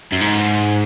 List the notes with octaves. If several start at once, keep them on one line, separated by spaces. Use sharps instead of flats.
F#2
G#2